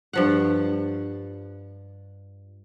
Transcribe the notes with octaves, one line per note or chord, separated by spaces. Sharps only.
G2 F3 F#5